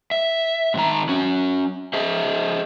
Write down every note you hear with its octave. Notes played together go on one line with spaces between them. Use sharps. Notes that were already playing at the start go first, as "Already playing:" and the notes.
E5
G#2 D#3 A#5
C#4 F#4
G#4 C5 D#5 E5